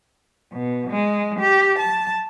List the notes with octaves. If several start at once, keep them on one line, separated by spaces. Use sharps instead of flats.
B2
G#3
G4
A5